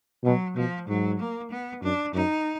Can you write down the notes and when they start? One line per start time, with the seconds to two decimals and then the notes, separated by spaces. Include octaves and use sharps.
0.24 B2 F#3
0.56 B2 F3
0.88 G#2 F#3
1.19 A#3
1.51 B3
1.82 F#2 D4
2.14 F#2 D#4